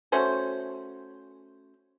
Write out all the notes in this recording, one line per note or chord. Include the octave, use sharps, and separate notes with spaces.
A3 C#4 F#4 C5